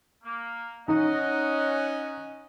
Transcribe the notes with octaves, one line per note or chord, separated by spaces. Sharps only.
A#3
C#4 D#4 D#5 F#5